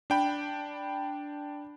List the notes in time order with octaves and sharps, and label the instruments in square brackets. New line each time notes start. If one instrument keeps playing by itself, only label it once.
[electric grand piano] D4 G5 B5